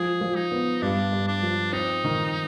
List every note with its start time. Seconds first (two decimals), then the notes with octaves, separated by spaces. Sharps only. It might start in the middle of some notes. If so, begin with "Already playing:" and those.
Already playing: F3 G#4
0.21 F3
0.36 D#4
0.52 B3
0.82 G2 D4
1.13 G2
1.28 D4
1.42 F3
1.73 C4 D#4
2.04 D#3